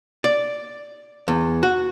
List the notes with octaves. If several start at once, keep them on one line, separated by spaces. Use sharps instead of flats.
D5
E2
F#4